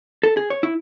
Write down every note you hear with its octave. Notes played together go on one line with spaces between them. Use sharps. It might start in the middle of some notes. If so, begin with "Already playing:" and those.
A4
G#4
C#5
E4